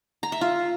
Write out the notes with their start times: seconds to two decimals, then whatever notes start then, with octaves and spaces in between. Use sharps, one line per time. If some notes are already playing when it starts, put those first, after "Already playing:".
0.23 A#5
0.32 E5
0.41 F4